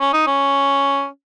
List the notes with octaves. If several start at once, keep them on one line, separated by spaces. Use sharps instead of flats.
C#4
D#4
C#4